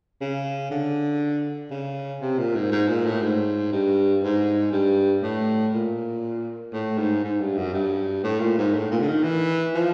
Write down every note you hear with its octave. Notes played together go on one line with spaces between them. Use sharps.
C#3
D3
C#3
C3
A#2
G#2
G#2
A#2
A2
G#2
G2
G#2
G2
A2
A#2
A2
G#2
G#2
G2
F#2
G2
A2
A#2
G#2
A2
A#2
D3
D#3
E3
F3